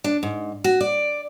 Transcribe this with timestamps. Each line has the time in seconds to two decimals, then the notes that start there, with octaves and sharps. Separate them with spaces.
0.04 D4
0.23 G#2
0.64 F#4
0.81 D5